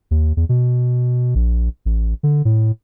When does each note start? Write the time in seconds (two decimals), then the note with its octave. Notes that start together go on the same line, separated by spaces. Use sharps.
0.11 D#2
0.37 E2
0.49 B2
1.35 A#1
1.85 A1
2.23 D3
2.45 A2